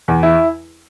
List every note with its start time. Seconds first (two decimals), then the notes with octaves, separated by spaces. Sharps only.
0.08 E2
0.23 E4